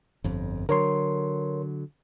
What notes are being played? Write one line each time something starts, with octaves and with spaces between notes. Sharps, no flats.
G1 F2
D3 F#3 A#4 C#5 C6